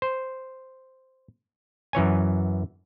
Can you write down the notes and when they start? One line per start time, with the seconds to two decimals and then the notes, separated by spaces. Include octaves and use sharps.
0.02 C5
1.93 F#2 E3 C#5 G#5